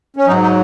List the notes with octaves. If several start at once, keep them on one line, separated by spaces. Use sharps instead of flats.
C#4
G#2 F#3 D#4
D#4